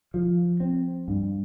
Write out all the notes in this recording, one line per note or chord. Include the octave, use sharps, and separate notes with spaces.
F3
C4
G2